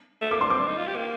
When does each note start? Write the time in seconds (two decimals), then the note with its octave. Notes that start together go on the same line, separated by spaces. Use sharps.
0.22 A3
0.31 A#3 D6
0.41 D4 C6
0.50 C4 D6
0.59 D4
0.68 D#4
0.78 F4
0.88 G4
0.96 A#3